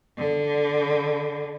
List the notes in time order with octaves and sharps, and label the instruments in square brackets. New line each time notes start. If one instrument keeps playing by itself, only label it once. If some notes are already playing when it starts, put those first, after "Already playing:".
[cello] D3